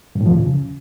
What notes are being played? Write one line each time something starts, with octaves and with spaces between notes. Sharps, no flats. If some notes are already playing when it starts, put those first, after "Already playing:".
G2
A2
F3
E2
C#3